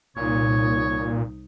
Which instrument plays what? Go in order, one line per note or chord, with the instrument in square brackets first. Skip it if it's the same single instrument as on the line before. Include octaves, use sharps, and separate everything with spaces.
[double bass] C2 D#4 [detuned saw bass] A#2 [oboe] C#5